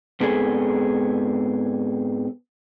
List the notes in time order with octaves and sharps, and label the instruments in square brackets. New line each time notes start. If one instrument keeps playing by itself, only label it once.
[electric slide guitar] G#2 B3 C4 G#4 A4